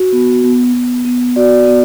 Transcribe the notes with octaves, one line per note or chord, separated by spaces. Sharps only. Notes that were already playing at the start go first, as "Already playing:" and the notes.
Already playing: F#4
B3
B3
B3
B3
F#4 D5
B3